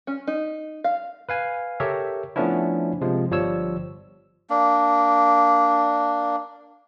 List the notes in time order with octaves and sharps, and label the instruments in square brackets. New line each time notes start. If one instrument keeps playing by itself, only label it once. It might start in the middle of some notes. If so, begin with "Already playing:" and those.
[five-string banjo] C#4
D#4
F5
[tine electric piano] B4 F5 G#5
G4 A4 A#4 C#5 E5
F3 A3 B3 C#4 D4 E4
C3 F3 G#3
G1 F3 G3 C#5 E6
[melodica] A#3 D4